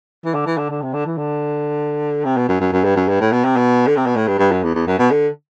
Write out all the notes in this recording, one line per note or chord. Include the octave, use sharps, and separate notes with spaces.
E3
D3
E3
D3
D3
C3
D3
E3
D3
C3
B2
F#2
F#2
F#2
G2
F#2
G2
A2
B2
C3
B2
D3
C3
B2
A2
G2
G2
F#2
E2
E2
F#2
B2
D3